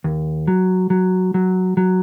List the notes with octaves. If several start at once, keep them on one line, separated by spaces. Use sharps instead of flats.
D#2
F#3
F#3
F#3
F#3